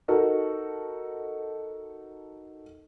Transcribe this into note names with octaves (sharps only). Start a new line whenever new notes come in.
D#4 F#4 A4 A#4